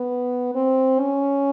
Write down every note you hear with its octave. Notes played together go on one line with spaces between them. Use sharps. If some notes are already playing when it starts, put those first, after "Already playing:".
Already playing: B3
C4
C#4